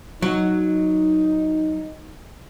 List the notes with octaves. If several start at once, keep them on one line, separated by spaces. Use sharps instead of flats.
F#3 D#4